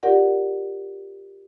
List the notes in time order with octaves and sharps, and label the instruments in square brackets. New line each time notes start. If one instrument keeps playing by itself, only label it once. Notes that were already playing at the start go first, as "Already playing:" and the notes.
[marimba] F4 G4 A#4 D5 F#5